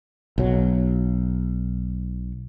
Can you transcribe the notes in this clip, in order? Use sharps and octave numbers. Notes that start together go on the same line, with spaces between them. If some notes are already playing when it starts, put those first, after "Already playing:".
B1 F#3